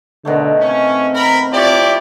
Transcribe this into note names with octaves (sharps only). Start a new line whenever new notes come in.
B2 D3 D#3 A3
C4 C#4
A#4 B5
F3 E4 G4 C#5 D5